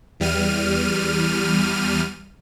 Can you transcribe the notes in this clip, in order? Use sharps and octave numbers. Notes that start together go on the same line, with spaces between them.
E2 G3 F6 D#7